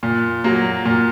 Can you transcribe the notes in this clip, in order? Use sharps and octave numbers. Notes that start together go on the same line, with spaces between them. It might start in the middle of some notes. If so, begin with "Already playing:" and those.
A#2
F#3 A#3
A#2